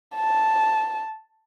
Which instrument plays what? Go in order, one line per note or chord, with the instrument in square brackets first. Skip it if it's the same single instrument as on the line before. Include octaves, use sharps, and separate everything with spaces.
[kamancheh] A5